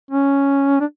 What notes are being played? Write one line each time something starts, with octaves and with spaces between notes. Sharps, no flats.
C#4
D4